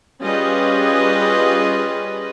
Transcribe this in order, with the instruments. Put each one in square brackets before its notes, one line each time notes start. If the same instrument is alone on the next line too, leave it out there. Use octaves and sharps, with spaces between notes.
[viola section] G3 C#4 F4 G#4 B4 D#5